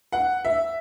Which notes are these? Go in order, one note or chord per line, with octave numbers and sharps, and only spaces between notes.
F#5
E5